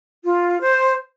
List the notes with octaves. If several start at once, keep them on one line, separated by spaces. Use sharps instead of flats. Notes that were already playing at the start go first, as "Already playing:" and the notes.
F4
C5